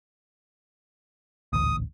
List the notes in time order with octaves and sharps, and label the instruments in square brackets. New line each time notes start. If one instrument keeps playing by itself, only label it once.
[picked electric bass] D#1 A1 D2 [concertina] D#6